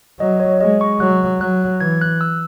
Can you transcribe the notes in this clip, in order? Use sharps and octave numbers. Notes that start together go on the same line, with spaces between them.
F#3 D#5
C#5
G#3 D#5
C#6
F#3 F#6
F#3 F#6
E3 G#6
F#6
E6